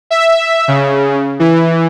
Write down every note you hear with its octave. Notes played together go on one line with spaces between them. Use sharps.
E5
C#3
E3